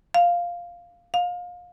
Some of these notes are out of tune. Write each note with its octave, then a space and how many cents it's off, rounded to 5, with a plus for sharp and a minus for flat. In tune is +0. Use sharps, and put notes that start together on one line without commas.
F5 +0
F5 +30